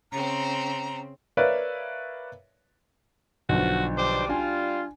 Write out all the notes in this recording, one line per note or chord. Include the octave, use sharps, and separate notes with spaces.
C#3 C4 A#5
A#4 B4 C#5 D5 E5 F5
B1 D3 F3 F#4
G3 D4 C5 D6
D4 F4 G#5